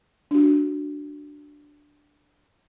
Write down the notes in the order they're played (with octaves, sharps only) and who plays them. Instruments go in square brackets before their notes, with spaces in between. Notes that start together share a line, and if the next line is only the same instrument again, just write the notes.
[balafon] D4 F#4